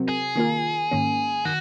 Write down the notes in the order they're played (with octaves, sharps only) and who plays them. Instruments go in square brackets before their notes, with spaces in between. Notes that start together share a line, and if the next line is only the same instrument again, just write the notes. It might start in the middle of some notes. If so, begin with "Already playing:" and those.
Already playing: [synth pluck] C3 F#3 C4 F#4 A#4
[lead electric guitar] G#4
[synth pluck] D#3 A#3 F4 A#4
G#2 D#3 A#3 C#4
[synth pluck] D#3 [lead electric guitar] F#4